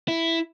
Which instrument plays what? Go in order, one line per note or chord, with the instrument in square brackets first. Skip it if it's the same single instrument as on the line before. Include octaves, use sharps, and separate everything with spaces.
[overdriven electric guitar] E4